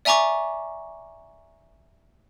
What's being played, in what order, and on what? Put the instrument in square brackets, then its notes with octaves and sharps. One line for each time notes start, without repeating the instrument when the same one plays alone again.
[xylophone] D5 E5 G#5 A#5 C#6 D6